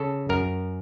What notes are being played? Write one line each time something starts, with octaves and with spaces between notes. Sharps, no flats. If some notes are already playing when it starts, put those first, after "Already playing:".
Already playing: C#3 A4
F#2 A#4